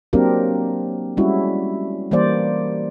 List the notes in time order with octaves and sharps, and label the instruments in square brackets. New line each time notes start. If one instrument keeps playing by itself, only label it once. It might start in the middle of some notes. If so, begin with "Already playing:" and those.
[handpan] F#3 A#3 C4 D4 G4 A#4
G3 G#3 C#4 E4 F#4
E3 G3 A#3 C5 D5